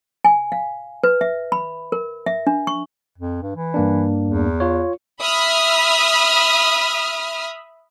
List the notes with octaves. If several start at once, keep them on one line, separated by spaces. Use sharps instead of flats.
G#5
F5
B4
E5
B5
A#4
E5
D4
C#6
F2
G2
E3
G2 A#3 D4
E2
F4 C#5
E5 B5 D#6 F6